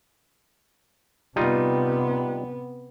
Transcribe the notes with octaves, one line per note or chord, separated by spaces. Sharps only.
C3 G3 B3 D#4 F4